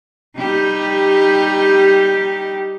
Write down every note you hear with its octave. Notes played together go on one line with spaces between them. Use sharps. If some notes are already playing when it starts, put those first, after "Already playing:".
G3 D#4 G4